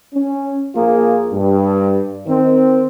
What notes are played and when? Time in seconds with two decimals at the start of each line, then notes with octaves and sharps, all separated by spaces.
0.13 C#4
0.75 A#1 A#3 F4 G#4
1.32 G2
2.27 D#3 C4